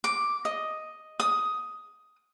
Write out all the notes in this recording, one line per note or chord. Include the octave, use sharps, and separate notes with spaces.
D6
D#5
D#6